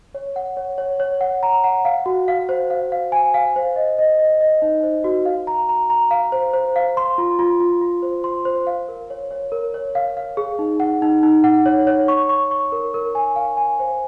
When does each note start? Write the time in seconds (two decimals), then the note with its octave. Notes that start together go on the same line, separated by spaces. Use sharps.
0.15 C#5
0.36 F#5
0.57 C#5
0.78 C#5
1.00 C#5
1.21 F#5
1.43 A#5
1.64 F#5
1.85 F5
2.06 F#4
2.28 F5
2.49 C5
2.70 F5
2.92 F5
3.12 G#5
3.34 F5
3.56 C5
3.76 D#5
3.98 D#5
4.19 D#5
4.40 D#5
4.62 D#4
4.83 C5
5.04 F#4
5.25 F5
5.47 A#5
5.69 A#5
5.90 A#5
6.11 F5
6.32 C5
6.54 C5
6.76 F5
6.97 C6
7.18 F4
7.39 F4
7.60 F4
7.81 F4
8.03 C5
8.24 C6
8.45 C5
8.67 F5
8.88 A#4
9.10 C#5
9.31 C#5
9.52 A#4
9.74 C#5
9.95 F5
10.17 F5
10.37 G#4
10.59 D#4
10.80 F#5
11.02 D#4
11.23 D#4
11.44 F#5
11.66 C#5
11.87 C#5
12.08 C#6
12.29 C#6
12.51 C#6
12.72 A#4
12.94 A#4
13.15 G#5
13.36 F5
13.57 G#5
13.79 C5